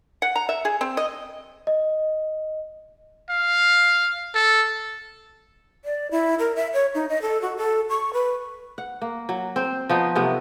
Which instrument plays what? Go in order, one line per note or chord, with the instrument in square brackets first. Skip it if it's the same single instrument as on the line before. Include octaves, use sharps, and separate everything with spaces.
[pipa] F#5
A#5
E5
G#4
C4
D#5
[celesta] D#5
[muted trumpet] F5
A4
[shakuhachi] D5
E4
A#4
E5
C#5
D#4
D#5
A4
F#4
A4
C#6
B4
[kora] F#5
A#3
F#3
C4 C5
F3 B3 D#4
C3 F#3 A3 B3